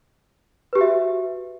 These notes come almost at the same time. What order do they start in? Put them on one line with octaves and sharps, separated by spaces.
B4 G4 F#4 E5